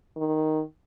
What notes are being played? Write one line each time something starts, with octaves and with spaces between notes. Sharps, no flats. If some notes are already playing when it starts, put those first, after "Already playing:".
D#3